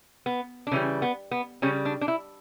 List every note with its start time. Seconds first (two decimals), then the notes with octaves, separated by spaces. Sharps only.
0.26 B3
0.67 D4
0.72 C#3 E3 G3 C#4
1.02 B3
1.31 B3
1.62 C#3 G3 C#4
1.85 D4
2.01 D4
2.08 E4